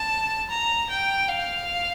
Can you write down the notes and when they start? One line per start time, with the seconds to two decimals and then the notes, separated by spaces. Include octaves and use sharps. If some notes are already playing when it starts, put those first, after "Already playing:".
Already playing: A5
0.50 A#5
0.90 G5
1.29 F5